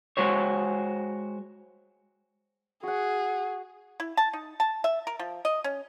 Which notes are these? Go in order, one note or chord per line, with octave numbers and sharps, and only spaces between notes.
G#3 F#4 C5 C#5
F#4 G#4 F#5
E4
A5
D#4
A5
E5
A#4
F3
D#5
C#4